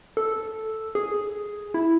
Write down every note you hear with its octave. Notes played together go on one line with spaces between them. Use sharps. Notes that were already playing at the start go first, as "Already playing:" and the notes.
A4
G#4
E4